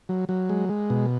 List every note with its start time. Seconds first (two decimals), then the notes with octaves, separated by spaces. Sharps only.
0.09 F#3
0.29 F#3
0.49 G#3
0.69 G#3
0.90 B2